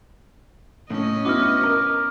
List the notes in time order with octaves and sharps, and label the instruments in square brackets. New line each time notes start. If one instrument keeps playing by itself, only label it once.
[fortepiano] A2 [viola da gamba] C#4 D#5
[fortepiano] B3 E4 F#4 [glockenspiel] D6 F6
[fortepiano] A#4